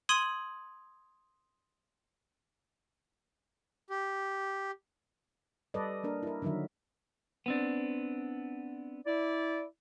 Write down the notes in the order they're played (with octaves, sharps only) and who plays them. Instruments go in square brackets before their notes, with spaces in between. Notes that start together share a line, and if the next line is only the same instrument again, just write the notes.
[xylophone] C6 D#6 G#6 D#7 F#7
[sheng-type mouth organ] G4
[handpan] G3 A4 B4 D5 D#5
A#3 D4 A#4
E4 A#4
D3 D#3 F#3 A#4 E5
[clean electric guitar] B3 C4 D4
[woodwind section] E4 D5